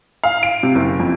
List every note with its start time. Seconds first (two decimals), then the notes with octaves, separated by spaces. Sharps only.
0.24 F5
0.43 D7
0.63 C3
0.75 F#1
1.00 F2